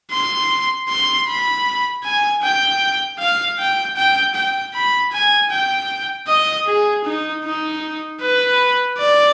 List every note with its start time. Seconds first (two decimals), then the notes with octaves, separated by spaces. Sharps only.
0.11 C6
0.89 C6
1.28 B5
2.04 G#5
2.42 G5
3.19 F5
3.59 G5
3.97 G5
4.35 G5
4.74 B5
5.12 G#5
5.51 G5
6.28 D#5
6.66 G#4
7.05 D#4
7.44 D#4
8.21 B4
8.98 D5